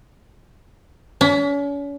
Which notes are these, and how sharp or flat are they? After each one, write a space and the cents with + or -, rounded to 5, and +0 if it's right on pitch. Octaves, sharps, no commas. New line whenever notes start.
C#4 +40